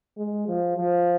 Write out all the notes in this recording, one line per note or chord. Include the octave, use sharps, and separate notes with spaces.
G#3
F3
F3